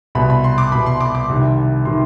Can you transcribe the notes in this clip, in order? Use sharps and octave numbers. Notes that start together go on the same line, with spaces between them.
C2 B2 B5
B5
C6
D6
C2 B2 B5
C6
D6
D6
C2 C3 D#3
C3 D#3 C6